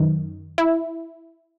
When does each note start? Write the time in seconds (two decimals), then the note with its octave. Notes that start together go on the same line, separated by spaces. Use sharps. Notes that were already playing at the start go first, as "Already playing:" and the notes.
Already playing: F#2 D#3
0.58 E4